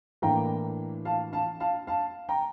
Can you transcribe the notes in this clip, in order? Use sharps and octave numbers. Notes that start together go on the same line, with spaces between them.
A2 E3 A#3 D4 G5 A#5
F5 A5
F5 A5
F5 A5
F5 A5
G5 A#5